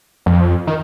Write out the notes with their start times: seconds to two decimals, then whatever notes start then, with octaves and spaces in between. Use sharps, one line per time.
0.26 F2
0.67 D#3